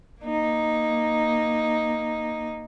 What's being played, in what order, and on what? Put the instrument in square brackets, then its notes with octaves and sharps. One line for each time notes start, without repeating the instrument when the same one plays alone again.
[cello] A#3 D#4